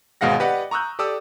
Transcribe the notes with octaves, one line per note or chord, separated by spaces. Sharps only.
G#1 B2 G#3 F5 F#5 A#6
G4 B4 D5 D#5 F#5
A#5 C#6 D#6 E6 F#6 G6
G4 A4 D5 D#6 E6